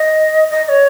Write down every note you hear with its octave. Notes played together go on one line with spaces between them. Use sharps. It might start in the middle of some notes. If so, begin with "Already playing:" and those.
Already playing: D#5
D#5
D#5
C#5